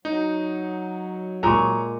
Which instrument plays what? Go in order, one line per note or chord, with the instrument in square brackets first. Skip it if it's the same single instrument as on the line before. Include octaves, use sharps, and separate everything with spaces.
[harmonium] F#3 [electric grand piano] D#4
[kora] A#2 G#3 [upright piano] A#5 C#6